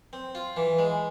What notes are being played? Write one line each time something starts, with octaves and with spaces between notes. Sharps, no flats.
C4
F4
E3
G#3